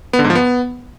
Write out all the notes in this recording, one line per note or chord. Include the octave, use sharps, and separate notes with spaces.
B3
D3
G#2
F3
B3